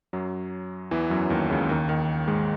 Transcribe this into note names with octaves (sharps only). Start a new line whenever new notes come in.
F#2 F#3
E2 E3
F#2 F#3
D#2 D#3
C#2 C#3
D#2 D#3
D#2 D#3
G#2 G#3